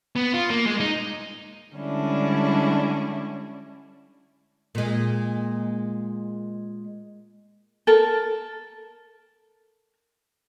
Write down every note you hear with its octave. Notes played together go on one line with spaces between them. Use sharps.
B3
F4
A#3
G#3
D#4
D3 G3 G#3 C#4 D4 E4
A#2 G#3
A4 A#4